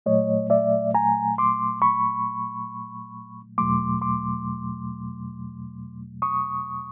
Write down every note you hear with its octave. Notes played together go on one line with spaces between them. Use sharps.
A#2 F#3 A3 C#5 D#5
D5 E5
G#5 A#5
C6 D6
B5 C#6
E2 B2 F#3 A3 C6 D6
C6 D6
C#6 D#6